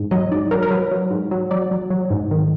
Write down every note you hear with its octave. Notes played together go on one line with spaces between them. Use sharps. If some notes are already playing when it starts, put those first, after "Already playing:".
Already playing: G#2
F#3 D#5
G#2 D5
F#3 A#4
A#4
F#3 B4
F#3
G#2
F#3
F#3 D5
F#3
F#3
G#2
D#3